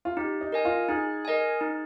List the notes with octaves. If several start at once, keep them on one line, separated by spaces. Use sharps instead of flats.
F4
D#4 G4
D#4
A#4 D#5 G#5
F4
D#4 G#4
A#4 D#5 G#5
D#4